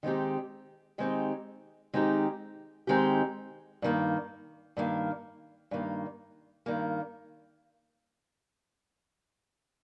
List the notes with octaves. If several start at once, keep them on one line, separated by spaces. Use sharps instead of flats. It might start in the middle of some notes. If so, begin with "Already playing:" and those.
D#3 G#3 C4 D#4 G4
D#3 G#3 C4 D#4 G4
D#3 G#3 C4 D#4 G4
D#3 G#3 C4 D#4 G4
G2 D#3 A#3
G2 D#3 A#3
G2 D#3 A#3
G2 D#3 A#3